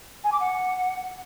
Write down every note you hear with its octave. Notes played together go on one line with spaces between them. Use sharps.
G#5
D6
F#5